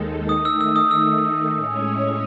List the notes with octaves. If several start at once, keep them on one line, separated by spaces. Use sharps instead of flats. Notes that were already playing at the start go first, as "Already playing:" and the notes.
Already playing: D#2 D#3 G#3 D#4 A4
D#3 A3 D#4 D#6
E6
E6
D#6
E6
A2 G#3 C#4 G#4 C#5